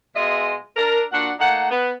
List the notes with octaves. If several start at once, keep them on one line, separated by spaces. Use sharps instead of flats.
B2 G#3 F4 G#4 D#5 E5
D4 A#4
A#2 D4 F#4 F#5
A3 A#3 D#4 F#5
B3